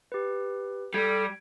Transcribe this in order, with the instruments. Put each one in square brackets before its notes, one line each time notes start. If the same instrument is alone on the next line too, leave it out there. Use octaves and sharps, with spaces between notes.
[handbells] G4 B4
[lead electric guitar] G3 [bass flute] A4 [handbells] G#6 D7